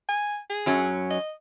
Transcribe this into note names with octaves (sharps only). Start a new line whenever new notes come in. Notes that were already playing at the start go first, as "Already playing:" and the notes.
G#5
G#4
F#2 F#3 C#4
D#5